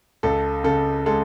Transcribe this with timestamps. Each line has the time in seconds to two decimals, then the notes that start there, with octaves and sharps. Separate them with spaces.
0.23 C#2 A4
0.64 C#3 A4
1.06 G#3 A4